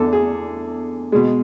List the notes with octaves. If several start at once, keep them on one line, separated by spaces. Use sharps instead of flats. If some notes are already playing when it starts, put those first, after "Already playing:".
Already playing: E2 D3 A4
G#4
B2 G#3